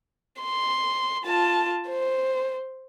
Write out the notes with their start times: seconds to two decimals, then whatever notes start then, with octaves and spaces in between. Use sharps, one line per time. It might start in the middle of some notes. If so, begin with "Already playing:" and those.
0.42 C6
1.25 F4 A5
1.89 C5